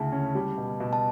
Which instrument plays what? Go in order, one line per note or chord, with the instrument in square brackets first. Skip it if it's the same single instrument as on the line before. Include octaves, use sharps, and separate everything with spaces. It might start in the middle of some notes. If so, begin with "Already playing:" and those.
Already playing: [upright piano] D2 C#3 E4 [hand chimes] A5
[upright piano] C#4
G3
B2
B2
[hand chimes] A5